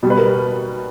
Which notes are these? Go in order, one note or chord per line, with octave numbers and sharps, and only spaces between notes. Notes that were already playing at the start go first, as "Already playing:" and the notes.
B2 G3
B4
A#4